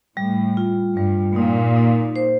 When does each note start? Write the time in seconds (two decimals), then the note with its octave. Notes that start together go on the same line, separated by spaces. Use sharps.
0.17 A2 G3
0.57 F4
0.96 G2 G3
1.36 A#2 D#4
1.76 D#4
2.16 C5